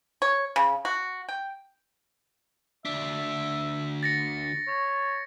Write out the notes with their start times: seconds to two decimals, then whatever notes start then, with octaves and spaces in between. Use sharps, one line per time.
0.22 C#5
0.56 C#3
0.85 F#4
1.29 G5
2.85 D2 D4 E5 B6
4.03 A6 A#6 C#7
4.68 C#5